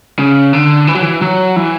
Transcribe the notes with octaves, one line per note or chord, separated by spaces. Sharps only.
C#3
D3
E3
F#3
E3
F#3
E3